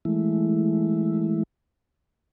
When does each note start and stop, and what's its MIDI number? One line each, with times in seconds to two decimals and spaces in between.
0.05 1.43 52
0.05 1.43 56
0.05 1.43 57
0.05 1.43 64